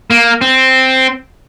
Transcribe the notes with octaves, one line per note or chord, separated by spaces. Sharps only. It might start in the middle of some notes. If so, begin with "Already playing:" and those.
A#3
C4